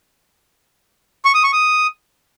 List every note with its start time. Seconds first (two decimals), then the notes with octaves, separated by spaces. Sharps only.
1.25 C#6
1.34 D#6
1.44 C#6
1.53 D#6